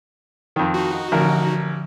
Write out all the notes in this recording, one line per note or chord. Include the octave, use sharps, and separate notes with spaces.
F2 D#3
D#4 F#4
A1 D3 F3 A#4